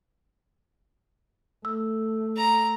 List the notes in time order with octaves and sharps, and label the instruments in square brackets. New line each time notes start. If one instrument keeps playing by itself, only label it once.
[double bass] A3 [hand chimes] E6
[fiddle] A#5